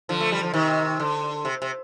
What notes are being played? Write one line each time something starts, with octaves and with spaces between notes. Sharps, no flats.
D3 F3
A3
G3
F3
C3 D#3
D3
C3
C3